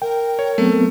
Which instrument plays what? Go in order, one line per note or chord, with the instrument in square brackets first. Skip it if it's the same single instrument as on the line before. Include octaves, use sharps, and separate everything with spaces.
[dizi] A#4 [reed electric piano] G5
[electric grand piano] C#5
[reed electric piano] F#3 B3 C4 [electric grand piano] A3